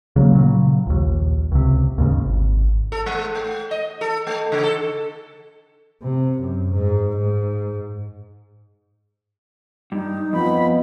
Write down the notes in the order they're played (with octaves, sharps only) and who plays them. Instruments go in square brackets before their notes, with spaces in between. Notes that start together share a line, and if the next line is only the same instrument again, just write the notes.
[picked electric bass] C#3 F#3 A3 A#3
A#2 C#3 F#3
A#1 D#2
C#2 C3
D#2 G#2 C#3
G#1
[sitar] A4
G#3
A3
D#5
A4
A3
C#3
A4
[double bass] C3
F#2
G#2
G#2
[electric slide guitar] G2 [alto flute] D#4
[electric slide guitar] F2 [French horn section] B3 F4 D#5 [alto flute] B5